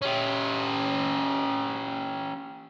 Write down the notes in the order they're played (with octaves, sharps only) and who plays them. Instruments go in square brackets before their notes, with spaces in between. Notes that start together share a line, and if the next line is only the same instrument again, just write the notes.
[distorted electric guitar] C#4 G4